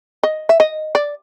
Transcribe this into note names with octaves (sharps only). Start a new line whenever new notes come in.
D#5
E5
D#5
D5